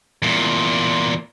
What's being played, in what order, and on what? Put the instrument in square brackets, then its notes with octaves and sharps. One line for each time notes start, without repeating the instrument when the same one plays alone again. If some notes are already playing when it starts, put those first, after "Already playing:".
[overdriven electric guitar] E2 A#2